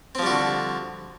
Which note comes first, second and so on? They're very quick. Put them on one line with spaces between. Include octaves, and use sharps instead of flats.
C4 F3 G3 F#4 D3